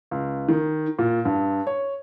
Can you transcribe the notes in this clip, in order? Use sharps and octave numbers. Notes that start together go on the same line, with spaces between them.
C#2
D#3
A#2
G2
C#5